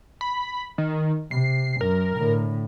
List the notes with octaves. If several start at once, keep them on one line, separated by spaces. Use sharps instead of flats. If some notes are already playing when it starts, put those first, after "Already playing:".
B5
D#3
C3 C7
F#2 A#4
A2 D3